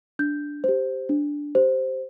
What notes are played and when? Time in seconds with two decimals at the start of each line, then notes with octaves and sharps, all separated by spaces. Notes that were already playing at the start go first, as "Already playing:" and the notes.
0.19 D4 G6
0.64 G4 C5
1.09 D4
1.55 G4 C5